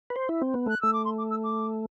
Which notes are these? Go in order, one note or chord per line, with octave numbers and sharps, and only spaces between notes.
B4
C5
E4
C4
B3
A3 F#6
A3 E6
D6
C6
D6
E6
D6